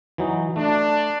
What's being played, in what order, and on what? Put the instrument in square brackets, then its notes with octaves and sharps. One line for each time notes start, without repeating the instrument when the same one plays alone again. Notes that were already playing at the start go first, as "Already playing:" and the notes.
[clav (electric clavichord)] E3 F#3 D#4
[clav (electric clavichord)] A3 [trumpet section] D4